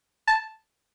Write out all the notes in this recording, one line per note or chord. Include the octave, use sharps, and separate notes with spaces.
A5